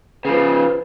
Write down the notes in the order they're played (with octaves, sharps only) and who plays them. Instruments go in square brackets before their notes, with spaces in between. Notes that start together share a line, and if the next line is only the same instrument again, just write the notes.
[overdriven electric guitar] C#3 F3 [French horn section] B4